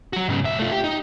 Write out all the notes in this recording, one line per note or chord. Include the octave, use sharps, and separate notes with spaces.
F#3 F#4
G#2 C#3
B1 E5
A3 F4
G4
D#4